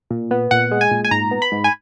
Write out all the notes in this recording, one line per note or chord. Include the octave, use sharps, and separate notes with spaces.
A#2
B3
A#2 F#5
G#3
G#5
A#2
G#5
G#2 A#5
B3
B5
G#2
G#5